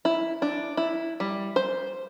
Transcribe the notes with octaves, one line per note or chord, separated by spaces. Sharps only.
E4
D4
E4
G3
C5